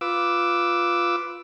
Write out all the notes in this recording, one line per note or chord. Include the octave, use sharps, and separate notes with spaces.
F4 B4 D6 E6